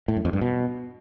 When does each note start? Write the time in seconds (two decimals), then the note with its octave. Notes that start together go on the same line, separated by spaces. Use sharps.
0.08 A2
0.17 F#2
0.25 F2
0.33 G2
0.41 B2